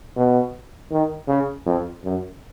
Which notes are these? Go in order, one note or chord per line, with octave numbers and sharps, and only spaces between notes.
B2
D#3
C#3
F2
F#2